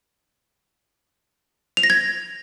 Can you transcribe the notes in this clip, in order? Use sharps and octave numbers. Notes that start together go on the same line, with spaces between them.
F7
A#6
G#6